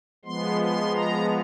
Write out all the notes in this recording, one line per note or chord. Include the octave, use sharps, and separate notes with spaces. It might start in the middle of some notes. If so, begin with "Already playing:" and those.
F3 G#3 B3 C6
C6
A#5